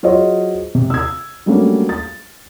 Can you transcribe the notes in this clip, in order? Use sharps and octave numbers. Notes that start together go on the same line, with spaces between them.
F#3 F4 G#4 C5 C#5 D#5
C3
E6 G#6
F#3 G3 A3 A#3 C#4 D4
A6